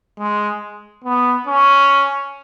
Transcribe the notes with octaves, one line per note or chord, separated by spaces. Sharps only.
G#3
B3
C#4